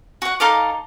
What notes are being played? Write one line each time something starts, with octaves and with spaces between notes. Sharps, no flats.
F#4 F#5
D#4 A4 F5 D6